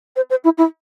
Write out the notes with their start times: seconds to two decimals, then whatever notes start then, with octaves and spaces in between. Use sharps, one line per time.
0.16 C5
0.30 C5
0.44 E4
0.58 E4